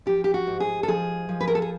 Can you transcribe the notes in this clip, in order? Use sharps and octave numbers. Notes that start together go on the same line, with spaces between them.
F3 G4
G4
F#4
G#2
G#4
A4
F3 G#4
F3
B4
A#4
A4
G#4